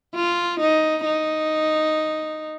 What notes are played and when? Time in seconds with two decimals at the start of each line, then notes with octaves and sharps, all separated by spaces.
0.15 F4
0.60 D#4
1.05 D#4